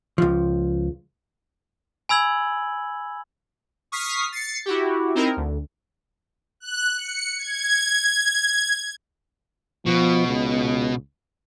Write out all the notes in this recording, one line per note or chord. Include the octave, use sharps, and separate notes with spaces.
C#2 F3
G#5 B5 E6 G#6 F#7
C#6 D#6 F6 B6 C7
A6 C7 C#7
E4 F#4 G4
C4 D#4 E4 A#4
D2
F#6
C#7
G#6
B2 F3
C#2